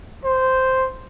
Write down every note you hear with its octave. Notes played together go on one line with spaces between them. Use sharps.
C5